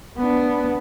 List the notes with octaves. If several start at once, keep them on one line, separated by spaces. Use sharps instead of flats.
B3 D4